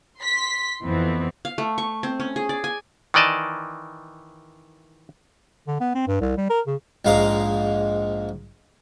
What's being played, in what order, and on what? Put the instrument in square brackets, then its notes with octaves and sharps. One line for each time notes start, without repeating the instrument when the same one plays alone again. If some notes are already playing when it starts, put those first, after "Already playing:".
[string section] C6 B6
F2 E3 B3 C4
[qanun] F5
A3
C#6
C4
C#4
G#4
D5
G#5
[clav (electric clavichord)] D#3 E3 D5 D#5 A5
[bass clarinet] D3
B3
C4
G2
C2
G3
A#4
C#3
[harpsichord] A#1 G#2 G#3 F5 A#5